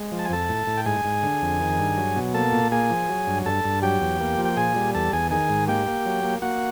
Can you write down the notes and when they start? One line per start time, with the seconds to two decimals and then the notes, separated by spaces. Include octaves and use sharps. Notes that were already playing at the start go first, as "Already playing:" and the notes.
Already playing: G#3
0.12 F3
0.19 A5
0.25 G#5
0.30 F2 A4 A5
0.49 A2
0.67 A2
0.77 G5
0.86 G#2 G#4 G#5
1.05 G#2
1.23 D3
1.42 F2
1.61 D#3
1.79 G2
1.98 F#3
2.16 B2
2.34 A#3 A4 A5
2.53 A#2
2.72 A#3 G#4 G#5
2.90 F3
3.09 F#3
3.27 G2
3.46 G2 A4 A5
3.65 G2
3.82 F#3 G4 G5
4.01 E2
4.20 A#3
4.38 F3
4.45 G5
4.57 A#2 G#4 G#5
4.76 G3
4.95 E2 A4 A5
5.13 E2 G#4 G#5
5.31 D#3 G#4 G#5
5.49 G#2
5.68 A#3 G4 G5
5.88 A#3
6.06 F#3
6.24 A#3
6.42 A#3 F#4 F#5